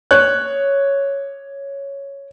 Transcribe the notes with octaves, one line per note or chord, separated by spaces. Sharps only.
C#5 F#6